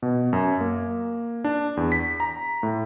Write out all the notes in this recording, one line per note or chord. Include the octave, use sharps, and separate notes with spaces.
B2
F#2
A#3
D4
E2
B6
A#5
A2